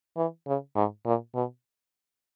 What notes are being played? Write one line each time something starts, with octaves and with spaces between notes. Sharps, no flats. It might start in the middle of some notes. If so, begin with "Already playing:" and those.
E3
C#3
G#2
A#2
B2